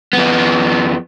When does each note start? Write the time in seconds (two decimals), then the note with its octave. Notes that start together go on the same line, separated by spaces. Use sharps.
0.13 F2 B3